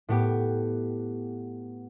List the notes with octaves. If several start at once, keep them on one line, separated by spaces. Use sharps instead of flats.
A2 B3 G4